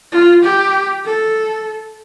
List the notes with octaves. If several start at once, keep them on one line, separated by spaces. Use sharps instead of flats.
F4
G4
A4